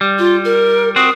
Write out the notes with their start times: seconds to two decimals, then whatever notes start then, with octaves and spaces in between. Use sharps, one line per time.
0.01 G3
0.18 F4
0.45 A#4
0.96 C4 F#4 D#6